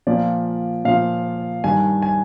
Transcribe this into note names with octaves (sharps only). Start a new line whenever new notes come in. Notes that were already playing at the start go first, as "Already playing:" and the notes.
A#2 F3 D5
A#2 F3 F5
G2 D#3 G#5
G#5